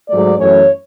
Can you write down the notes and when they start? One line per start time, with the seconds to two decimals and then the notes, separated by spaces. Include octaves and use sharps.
0.10 G#2 F#3 A3 D5
0.38 F#2 E3 A3 C#4 C#5